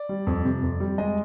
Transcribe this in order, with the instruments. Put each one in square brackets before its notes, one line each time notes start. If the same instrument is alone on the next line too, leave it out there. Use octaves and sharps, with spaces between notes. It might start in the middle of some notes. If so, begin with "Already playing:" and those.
Already playing: [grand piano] D5
G3
F2
C3
F2
G3
G#3 D#5